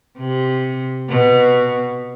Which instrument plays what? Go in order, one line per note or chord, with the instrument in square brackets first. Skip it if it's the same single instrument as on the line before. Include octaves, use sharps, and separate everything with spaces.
[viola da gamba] C3
B2